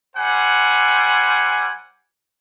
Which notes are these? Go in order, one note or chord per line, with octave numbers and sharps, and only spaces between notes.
G3 C5 F#5 G#5